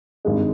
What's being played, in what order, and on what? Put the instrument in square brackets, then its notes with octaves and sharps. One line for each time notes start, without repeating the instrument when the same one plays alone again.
[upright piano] G#1 G2 D#3 G#3